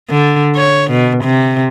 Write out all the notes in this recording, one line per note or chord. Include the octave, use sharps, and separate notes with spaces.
D3
C#5
B2
C3